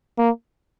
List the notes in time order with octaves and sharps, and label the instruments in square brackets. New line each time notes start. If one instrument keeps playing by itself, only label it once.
[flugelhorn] A#3